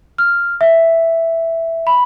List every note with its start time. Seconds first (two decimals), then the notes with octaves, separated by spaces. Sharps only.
0.18 F6
0.61 E5
1.87 B5